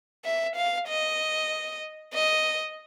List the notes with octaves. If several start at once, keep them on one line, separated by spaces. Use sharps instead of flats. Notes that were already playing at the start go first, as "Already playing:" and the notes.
E5
F5
D#5
D#5